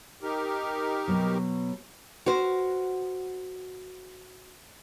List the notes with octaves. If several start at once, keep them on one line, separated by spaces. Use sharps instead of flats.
D#4 G4 A#4
B2 F#3
F#4 A#4 C5